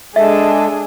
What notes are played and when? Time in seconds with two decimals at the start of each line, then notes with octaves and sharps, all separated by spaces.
0.16 G#3 D4 G#4 A4 E5